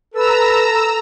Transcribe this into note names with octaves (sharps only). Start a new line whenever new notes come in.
A4 B4 A#5 E6